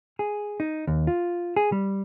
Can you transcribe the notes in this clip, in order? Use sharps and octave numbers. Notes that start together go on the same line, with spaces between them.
G#4
D#4
D#2
F4
G#4
G3